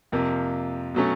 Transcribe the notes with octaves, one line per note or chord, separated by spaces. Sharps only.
F2 C3 F3 A#3
B2 F#3 A3 C#4